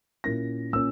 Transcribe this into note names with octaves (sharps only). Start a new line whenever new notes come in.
A#2 A#3 C#4 E4 A#6
A#2 A#3 C#4 E6